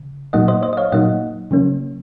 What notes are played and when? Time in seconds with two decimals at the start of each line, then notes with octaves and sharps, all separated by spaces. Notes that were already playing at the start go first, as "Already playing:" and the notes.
Already playing: C#3
0.33 A#2 F#3 A#3 D#4 D#5 F#5
0.48 C5 D#5
0.63 C5 D#5
0.73 D#5
0.77 C#5 F5
0.92 A#2 F#3 A#3 D#4 D#5 F#5
1.51 C#3 F#3 A#3 C#4